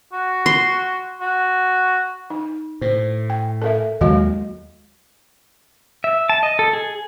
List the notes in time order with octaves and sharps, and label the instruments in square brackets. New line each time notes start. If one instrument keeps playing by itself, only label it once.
[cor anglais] F#4
[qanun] C6
[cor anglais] F#4
[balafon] D#4
[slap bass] A2 [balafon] C5
[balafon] G5
A4 A#4 E5
[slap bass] D#2 D#3 F#3 [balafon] G#3 F#4 D#5
[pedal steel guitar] E5
A5
D#5
A4
G#4